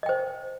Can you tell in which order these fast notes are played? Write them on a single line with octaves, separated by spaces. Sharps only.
D#5 G5 C5